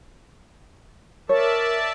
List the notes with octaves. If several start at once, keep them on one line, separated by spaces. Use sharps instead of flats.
A#4 C#5 D5 E5 A5